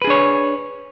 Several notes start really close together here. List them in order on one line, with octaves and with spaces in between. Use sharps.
B4 G#4 D4 C#5